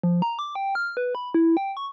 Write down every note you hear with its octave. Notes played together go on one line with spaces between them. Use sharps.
F3
A#5
D6
G5
F6
B4
B5
E4
G5
C#6